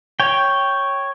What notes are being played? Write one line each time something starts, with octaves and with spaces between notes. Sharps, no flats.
C#5 G5